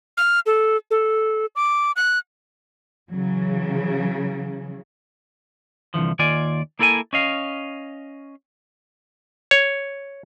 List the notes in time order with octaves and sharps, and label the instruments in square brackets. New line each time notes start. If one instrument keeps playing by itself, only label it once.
[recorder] F6
A4
A4
D6
F#6
[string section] C#3 E3 F#3
[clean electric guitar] C2 D3 E3 F3
D#2 D#3 F4 D5 G#5
A#3 E4 A4 A#4 F5 G#5
C#4 D#5 F5
[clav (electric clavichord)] C#5